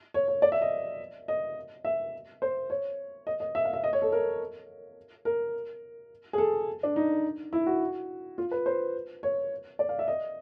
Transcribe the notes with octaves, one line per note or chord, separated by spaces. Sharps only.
C#5
C#5
D5
E5
D#5
D#5
E5
C5
C#5
D#5
D#5
E5
F5
E5
D#5
C#5
A4
A#4
A#4
G#4
A4
D4
D#4
E4
F#4
F4
B4
C5
C#5
D5
F5
E5
D#5